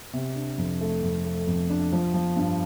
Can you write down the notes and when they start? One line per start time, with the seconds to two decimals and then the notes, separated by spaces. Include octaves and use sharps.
0.13 C3
0.36 D4
0.58 F2
0.81 A3
1.03 F2
1.24 A3
1.47 F2
1.70 D4
1.92 F3
2.14 F3
2.36 G2